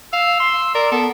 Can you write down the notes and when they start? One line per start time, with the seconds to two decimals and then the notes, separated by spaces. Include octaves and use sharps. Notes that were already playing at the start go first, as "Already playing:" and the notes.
0.13 F5 E6
0.40 C6
0.75 A#4 D5
0.92 B3 A4